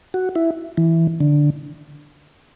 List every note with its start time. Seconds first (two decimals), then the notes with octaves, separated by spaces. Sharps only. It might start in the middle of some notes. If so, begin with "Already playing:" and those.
0.14 F#4
0.36 E4
0.77 E3
1.20 D3